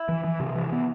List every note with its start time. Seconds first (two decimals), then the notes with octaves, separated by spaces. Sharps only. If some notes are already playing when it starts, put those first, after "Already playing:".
Already playing: E4
0.09 E3
0.25 E3
0.40 C3
0.56 E3
0.72 B3